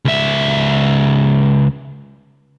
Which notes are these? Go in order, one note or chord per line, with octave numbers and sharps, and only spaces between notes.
C#2 E5